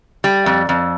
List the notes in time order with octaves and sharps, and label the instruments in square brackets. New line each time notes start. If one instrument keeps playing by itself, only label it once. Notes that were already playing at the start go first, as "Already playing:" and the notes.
[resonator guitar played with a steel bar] G3
F2
F2